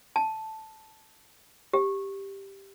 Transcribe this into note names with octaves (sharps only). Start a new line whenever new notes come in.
A5
G4